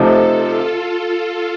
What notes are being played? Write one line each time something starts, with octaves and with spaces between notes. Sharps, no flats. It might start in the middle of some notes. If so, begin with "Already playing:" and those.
Already playing: C3 F3 A3 D#4 A4
F4